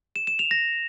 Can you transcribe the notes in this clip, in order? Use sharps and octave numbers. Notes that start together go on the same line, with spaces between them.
E7
E7
F7
A#6